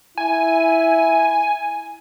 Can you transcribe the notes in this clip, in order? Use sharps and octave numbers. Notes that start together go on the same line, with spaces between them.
E4 G#5